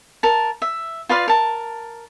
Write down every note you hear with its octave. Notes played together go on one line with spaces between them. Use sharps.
A#4 A5
E5
F4 B4 D5 F5
A#4 A5